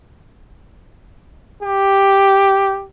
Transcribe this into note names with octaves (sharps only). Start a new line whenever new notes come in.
G4